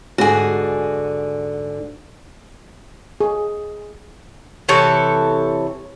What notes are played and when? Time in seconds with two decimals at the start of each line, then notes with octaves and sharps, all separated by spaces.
0.18 G#2 D3 F#4 G#4
3.20 G#4
4.68 C3 E3 A4 C#5